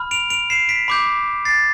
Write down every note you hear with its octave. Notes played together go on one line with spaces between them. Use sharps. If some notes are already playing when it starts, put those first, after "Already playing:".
Already playing: B5 F6
D7 F7
D7 F7
C7 E7
B6 D7
B5 D6 G6
A6 C7